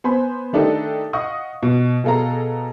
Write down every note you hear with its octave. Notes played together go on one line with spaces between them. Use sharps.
B3 C5 G#5 B5
D#3 A3 D4 D#4 G4 A4
D#5 F5 F#5 C#6 D#6
B2
B2 G#4 A4 F5 A#5